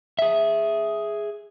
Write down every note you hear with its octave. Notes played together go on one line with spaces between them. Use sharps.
G#4 E5